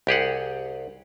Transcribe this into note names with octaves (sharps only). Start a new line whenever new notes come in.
C2 G4 G#4 F#5